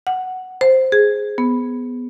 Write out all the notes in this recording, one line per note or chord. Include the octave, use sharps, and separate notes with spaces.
F#5
C5
G#4
B3